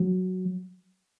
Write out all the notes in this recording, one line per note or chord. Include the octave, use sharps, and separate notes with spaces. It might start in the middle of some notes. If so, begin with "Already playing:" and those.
Already playing: F#3